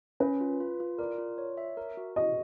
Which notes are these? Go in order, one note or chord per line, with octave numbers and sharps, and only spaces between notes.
C#4 B4
F4
F4
F4
A#4 D5
F4
C#5
E5
A#4
F#4
F#4 D#5